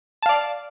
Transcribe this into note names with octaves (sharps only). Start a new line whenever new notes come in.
D5 F5 A5